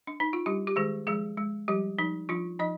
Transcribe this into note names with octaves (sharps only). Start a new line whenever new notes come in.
D4
D#4
F4
G3 D4 G4
G4
D#3 G#3 G#4
F3 G#3 G#4
G#3
F3 G3 G4
F3 D#4
F3 D4 F4
F3 D#4 D#5